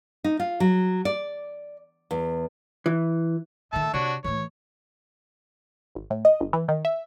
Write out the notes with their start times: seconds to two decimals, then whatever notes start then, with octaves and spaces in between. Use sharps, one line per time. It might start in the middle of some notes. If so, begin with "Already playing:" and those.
0.24 D#4
0.40 F4
0.60 F#3
1.05 D5
2.11 E2
2.86 E3
3.73 A#2 D#3 E5 A5
3.94 C3 D4 F#4 C#5
4.24 A2 E3 C#5
5.95 G#1
6.10 A2
6.25 D#5
6.40 G1
6.53 E3
6.68 D#3
6.85 E5